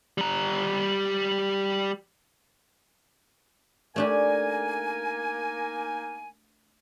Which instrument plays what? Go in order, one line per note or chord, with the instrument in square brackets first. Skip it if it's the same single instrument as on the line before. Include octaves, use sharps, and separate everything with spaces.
[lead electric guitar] G3 A#5
[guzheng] A3 D4 G4 [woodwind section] A#3 D#4 G#5